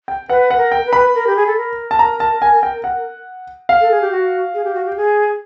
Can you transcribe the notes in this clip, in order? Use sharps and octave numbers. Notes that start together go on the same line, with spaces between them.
G5
B4 F#5
F#5
A#4
G5
B4
B5
A#4
G4
G#4
A4
A#4
A5
A#5
A5
G#5
G5
F#5
F5
A4
G#4
G4
F#4
G#4
G4
F#4
G4
G#4